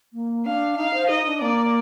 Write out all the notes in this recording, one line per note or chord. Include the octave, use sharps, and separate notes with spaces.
A#3
D4 F5
D#4 F5
C5
D#4 D#5
D4
A#3 D5